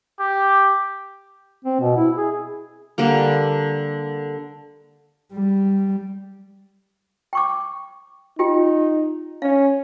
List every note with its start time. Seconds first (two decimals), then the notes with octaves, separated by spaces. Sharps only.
0.20 G4
1.64 C4
1.80 B2
1.96 E4
2.16 G#4
2.98 D3 G3 A#3
5.33 G3
7.33 G5 C#6 D6
8.39 D#4 F4 G4 G5
9.42 C#4 F5